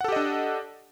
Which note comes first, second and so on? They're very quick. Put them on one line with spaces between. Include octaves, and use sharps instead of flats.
F#5 A4 G4 D#5 D4